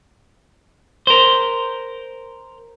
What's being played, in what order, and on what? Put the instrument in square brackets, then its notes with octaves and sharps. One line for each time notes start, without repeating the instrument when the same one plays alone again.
[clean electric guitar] A#4 C5